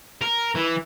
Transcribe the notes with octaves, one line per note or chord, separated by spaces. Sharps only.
A#4
E3